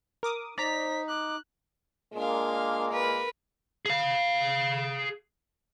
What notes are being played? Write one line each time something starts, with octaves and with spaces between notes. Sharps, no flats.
A#4 D6 D#6
D#4 C5 D5 A#5 B6
D6 F#6
A#2 G#3 A#3 D4 F5
A#4 B4
G#4 F5